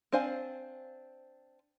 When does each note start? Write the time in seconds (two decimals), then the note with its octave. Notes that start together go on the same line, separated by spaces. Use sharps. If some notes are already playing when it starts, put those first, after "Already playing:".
0.12 C4 D4 C5 F5 G#5